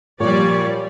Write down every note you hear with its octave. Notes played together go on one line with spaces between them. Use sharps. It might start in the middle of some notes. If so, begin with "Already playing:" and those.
A#2 F3 G3 C#5 D5